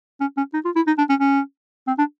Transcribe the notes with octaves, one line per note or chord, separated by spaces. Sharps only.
C#4
C#4
D#4
F4
E4
D#4
D4
C#4
C#4
C4
D4